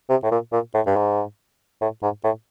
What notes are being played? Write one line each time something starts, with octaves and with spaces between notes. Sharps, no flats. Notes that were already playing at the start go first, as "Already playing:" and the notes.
C3
A2
A#2
A#2
A2
G2
G#2
A2
G#2
A2